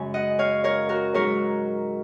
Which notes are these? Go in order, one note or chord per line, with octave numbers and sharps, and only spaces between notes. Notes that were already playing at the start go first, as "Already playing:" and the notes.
Already playing: F#2 C#3 G#3 G#5
D#5 F#5
C#5 F5
A#4 C#5
F#4 A#4
G#2 F#3 A#4 C#5